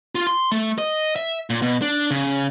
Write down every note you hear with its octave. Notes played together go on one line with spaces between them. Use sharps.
F4
C6
A3
D#5
E5
A#2
B2
D4
C#3